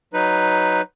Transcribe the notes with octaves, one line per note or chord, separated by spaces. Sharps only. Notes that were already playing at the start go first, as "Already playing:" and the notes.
F#3 D#4 B4